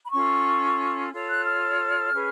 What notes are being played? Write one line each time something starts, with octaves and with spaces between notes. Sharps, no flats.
B5
C#4 F4 A4 C#6
F4 A4 C#5
F#6
F6
C#4 G#4 B4